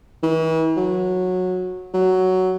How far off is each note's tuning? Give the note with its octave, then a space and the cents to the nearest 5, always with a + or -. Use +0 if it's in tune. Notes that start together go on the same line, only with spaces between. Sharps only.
E3 -40
F#3 -15
F#3 +5